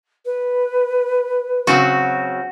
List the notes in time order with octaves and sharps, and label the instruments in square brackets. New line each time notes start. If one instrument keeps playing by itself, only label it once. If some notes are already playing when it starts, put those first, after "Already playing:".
[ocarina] B4
[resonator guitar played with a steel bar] C#3 F#3 C4 [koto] F#4